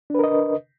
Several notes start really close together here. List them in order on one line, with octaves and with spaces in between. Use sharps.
D4 B4 A#4 D#5